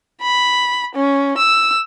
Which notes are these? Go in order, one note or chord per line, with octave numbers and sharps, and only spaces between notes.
B5
C#4
E6